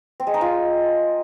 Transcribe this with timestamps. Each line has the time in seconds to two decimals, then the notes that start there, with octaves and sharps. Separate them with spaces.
0.20 C4
0.27 G#3
0.34 D#4
0.41 F4